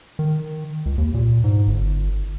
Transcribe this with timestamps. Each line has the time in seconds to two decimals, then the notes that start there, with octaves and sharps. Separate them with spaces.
0.19 D#3
0.86 C#2
0.98 D#2
1.14 A#2
1.44 G#2
1.68 G1